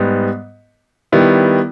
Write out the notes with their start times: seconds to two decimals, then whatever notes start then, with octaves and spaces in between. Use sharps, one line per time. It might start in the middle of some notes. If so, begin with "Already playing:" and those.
Already playing: G#2 G3 B3
1.12 D#3 G3 B3 E4